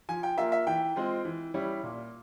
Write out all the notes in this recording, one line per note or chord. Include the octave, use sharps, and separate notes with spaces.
F3 G#5
G5
A#3 F4 E5
E5
E3 G5
G#3 C4 F4
E3
G3 C#4 E4
A#2